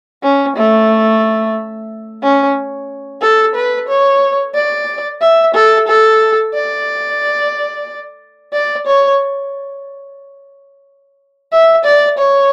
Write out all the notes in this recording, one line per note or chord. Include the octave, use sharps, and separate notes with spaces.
C#4
A3
C#4
A4
B4
C#5
D5
E5
A4
A4
D5
D5
C#5
E5
D5
C#5